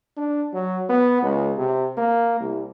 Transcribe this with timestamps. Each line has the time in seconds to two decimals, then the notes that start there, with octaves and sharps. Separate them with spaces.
0.17 D4
0.53 F#3
0.89 B3
1.22 C#2
1.57 C3
1.97 A#3
2.40 C2